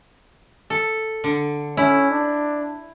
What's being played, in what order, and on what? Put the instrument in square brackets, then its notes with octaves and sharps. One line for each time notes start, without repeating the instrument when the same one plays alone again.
[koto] A4
D3
[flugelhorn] C#4 [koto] E4
[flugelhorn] D4